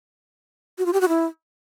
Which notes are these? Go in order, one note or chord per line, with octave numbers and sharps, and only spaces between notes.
F#4
F4
G4
F#4
E4